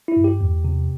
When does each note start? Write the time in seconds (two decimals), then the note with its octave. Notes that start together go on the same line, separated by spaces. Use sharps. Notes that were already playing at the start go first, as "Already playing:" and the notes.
0.08 E4
0.16 G2
0.24 G4
0.41 E2
0.64 C3